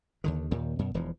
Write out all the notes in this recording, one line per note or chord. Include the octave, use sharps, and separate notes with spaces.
D#2 D3 D#3
D#2 A#2 D#3
F#2 B2
E1 E3 F3